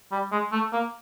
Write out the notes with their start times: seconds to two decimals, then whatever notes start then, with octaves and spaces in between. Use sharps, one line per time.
0.12 G3
0.32 G#3
0.52 A3
0.73 A#3